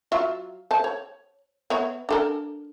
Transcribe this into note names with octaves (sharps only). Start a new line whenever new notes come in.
F#3 F4 E5
C5 A5
C#5
B3 C#5 E5
D4 A4 A#4